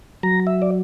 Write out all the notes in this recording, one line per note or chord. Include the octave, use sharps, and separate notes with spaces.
F#3 A#5
E5
D5